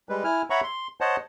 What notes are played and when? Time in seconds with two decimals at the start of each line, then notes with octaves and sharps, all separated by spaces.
0.09 G3 G#3 B4
0.24 E4 G#5 F6
0.50 C#5 E5 F#5 A#5 B5 C#6
0.63 C6
1.01 C5 C#5 D#5 F#5 A5